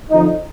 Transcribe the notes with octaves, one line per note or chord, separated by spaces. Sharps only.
F2 D3 F3 D#4